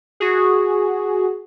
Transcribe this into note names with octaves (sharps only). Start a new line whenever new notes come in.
F#4 G#4